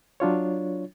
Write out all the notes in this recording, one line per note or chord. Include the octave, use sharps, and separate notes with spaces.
F#3 D4 F4 C#5